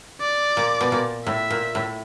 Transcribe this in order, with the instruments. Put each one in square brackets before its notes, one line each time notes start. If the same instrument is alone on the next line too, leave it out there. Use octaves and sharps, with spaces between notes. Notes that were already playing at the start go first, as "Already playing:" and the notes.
[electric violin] D5
[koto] A#2
B2
A#2
[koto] A2 [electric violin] E5
[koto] A#2
A2